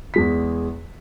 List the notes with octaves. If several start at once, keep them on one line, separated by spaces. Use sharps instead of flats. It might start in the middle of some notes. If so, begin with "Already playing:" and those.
E2 G#3 B6